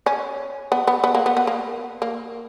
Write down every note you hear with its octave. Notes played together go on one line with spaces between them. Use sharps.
C#4
B3
B3
B3
A#3
B3
B3
A#3
A#3